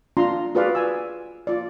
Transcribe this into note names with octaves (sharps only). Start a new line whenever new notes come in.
D4 F4 A#5 C6
F4 F#4 G#4 B4 D5 F5
G#5 E6
F4 D5